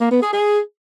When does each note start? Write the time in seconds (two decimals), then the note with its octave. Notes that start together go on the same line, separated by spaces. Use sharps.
0.01 A#3
0.12 B3
0.22 G#4
0.33 G#4